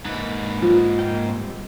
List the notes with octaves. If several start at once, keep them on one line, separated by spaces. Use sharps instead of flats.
G#2 A#3 D#4 B4
F3
A#3 F5 G5
G3 A3 C4